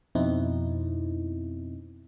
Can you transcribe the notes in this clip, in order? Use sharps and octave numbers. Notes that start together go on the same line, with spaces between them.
F2 B2 C4 D#4 E4